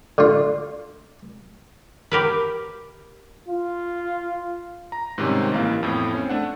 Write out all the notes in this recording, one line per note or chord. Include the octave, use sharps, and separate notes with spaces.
D3 F4
G4 A#4 B4
F4
A#5
G#2 C3 D#3 G3 C4 C#4
A1 E3 A#3 F5
F2 A2 B3
C4 C#4
A3 D4 F#5